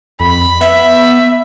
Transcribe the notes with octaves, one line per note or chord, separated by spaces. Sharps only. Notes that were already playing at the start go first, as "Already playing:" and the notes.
F2 B5
B3 E5